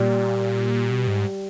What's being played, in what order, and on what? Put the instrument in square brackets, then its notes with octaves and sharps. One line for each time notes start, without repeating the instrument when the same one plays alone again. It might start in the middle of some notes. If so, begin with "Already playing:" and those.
Already playing: [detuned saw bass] A#2 [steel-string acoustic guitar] G3
[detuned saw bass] B2
G#2